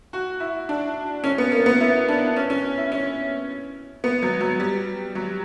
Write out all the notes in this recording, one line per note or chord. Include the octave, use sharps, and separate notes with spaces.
F#4
E4
D4
C#4
B3
A#3
B3
E4
D4
C#4
C#4
E4
C#4
B3
F#3
F#3
G3
F#3